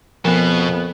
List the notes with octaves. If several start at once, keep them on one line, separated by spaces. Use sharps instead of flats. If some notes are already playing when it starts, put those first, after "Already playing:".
F2 B2 F3 B3